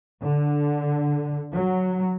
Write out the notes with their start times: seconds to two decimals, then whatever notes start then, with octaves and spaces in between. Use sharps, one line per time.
0.21 D3
1.52 F#3